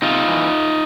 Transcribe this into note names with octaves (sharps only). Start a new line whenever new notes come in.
C3 D#4 F4
E3